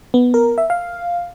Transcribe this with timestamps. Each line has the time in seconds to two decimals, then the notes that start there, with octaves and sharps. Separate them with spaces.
0.14 B3
0.34 A#4
0.58 E5
0.70 F5